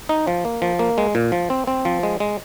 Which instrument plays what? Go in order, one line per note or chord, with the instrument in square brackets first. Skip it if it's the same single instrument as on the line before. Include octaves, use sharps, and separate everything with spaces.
[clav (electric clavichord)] D#4
F3
A#3
F3
A#3
G#3
A#2
F3
C4
C4
F3
G#3
G#3